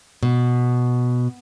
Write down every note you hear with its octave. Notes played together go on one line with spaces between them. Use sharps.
B2